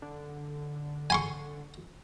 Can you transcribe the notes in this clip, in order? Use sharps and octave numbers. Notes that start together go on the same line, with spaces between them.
D3
G#5 C6 C#6